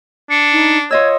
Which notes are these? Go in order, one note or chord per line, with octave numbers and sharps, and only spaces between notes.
D4 C#7
D#4
F4 C#5 D#5 E6 G#6